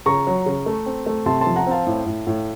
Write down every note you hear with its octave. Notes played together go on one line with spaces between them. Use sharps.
C#3 A#5 C#6
F#3
C#3
A3
C4
A3
C3 A5 C6
F3 A5 C6
F#5 A#5
C4 F5 A5
A2
A2
A2